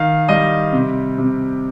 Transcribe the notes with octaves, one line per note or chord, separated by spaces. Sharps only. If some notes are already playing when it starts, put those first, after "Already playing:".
Already playing: D#3 F5
G3 D#5
C3
C3